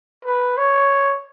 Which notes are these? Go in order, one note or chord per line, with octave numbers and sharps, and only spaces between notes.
B4
C#5